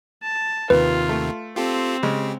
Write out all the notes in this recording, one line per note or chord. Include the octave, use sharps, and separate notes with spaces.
A5
D#2 C3 D#3 F4 B4
A3
C4 F4 G4 A4
C#3 G#3 G4